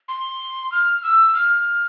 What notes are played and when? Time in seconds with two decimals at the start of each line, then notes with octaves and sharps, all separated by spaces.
0.08 C6
0.72 F6
1.03 E6
1.35 F6